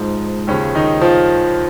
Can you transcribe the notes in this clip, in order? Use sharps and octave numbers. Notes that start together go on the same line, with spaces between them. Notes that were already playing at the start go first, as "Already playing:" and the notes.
Already playing: G#2 F3
D#2 C#3 F3 C#4
D#3 D#4
F3 F4